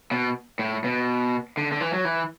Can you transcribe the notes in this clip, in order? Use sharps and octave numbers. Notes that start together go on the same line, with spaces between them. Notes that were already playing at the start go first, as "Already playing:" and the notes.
B2
A2
B2
D3
D3
E3
F#3
E3